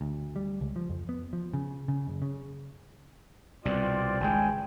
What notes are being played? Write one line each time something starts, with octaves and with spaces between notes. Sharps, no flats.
D2
G3
C#2
F3
F2
B3
F3
C#3
C#3
F#1
C#3
C2 B2 C4 F4 D5
G#1 C#2 G#3 G5 G#5